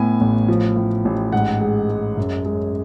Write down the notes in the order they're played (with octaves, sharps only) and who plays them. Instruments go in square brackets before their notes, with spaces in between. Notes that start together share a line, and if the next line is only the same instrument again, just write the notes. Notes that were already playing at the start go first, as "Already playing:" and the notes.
Already playing: [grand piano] A2 B3 G#5
A1
F3
A2
A1
G#2 F#5
G#3
G#3
F#2
G#3